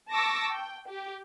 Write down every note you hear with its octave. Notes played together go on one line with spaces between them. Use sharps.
A5 C#6 D6 E6 A#6
G5
G4